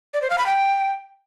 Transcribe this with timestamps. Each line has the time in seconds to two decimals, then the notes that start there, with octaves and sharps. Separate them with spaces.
0.14 D5
0.22 C5
0.30 F5
0.38 B5
0.46 G5